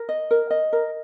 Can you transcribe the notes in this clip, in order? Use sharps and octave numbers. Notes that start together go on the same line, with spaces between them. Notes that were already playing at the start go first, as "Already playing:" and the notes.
Already playing: A#4
D#5
A#4
D#5
A#4